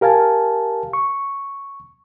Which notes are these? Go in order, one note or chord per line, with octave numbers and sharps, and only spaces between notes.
G4 A#4 F5 G#5 A5
C#6